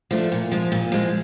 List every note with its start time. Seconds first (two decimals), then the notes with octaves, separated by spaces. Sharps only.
0.11 F3 A3 D4
0.32 A#2
0.51 F3 G#3
0.72 A#2
0.92 F3 G#3